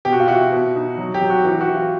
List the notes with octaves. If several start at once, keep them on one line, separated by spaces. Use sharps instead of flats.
B2 G4
F#4
F4
E4 F#4
B2
D#4
F#3
G4
F#3
F#4
E3 G4
F#4
E3
F4